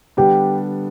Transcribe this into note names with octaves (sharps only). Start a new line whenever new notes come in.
D3 G3 B3 D4 G4